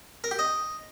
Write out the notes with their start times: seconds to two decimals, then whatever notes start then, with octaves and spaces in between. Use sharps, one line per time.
0.24 A#4
0.31 G4
0.39 D#5